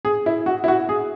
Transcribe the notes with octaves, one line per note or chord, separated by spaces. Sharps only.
G#4
E4
F#4
E4
F#4
G#4